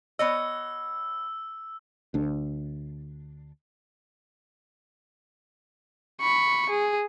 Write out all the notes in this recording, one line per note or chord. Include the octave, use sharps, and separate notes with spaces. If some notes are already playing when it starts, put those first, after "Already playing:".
B3 C#5 D#5 E6
D2 D4
B5 C#6
G#4